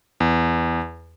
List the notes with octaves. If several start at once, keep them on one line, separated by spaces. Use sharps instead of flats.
E2